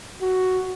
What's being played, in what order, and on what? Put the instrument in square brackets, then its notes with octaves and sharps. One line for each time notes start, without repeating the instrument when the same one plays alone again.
[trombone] F#4